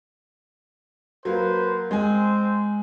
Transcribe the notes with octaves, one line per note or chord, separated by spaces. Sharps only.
F#3 A#3 B4 C5
G#3 C4 C5 G#5